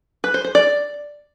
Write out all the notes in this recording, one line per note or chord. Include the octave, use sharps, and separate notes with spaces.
B4
C5
C5
D5